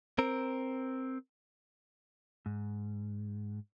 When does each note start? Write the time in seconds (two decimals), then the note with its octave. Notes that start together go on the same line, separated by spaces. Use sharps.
0.19 C4 A#4
2.46 G#2